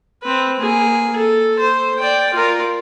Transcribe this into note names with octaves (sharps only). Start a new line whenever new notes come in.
C4 B4
A#3 G#4
A4
C5
D5 G5
F4 A#4